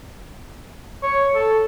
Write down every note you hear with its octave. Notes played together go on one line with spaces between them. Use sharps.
C#5
A4